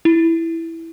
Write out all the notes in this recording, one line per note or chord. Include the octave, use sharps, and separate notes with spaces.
E4